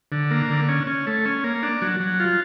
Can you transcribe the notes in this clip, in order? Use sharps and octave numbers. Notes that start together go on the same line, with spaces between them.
D3
A#3
D3
C#4
C#4
A3
C#4
A#3
D4
F#3
F#3
F4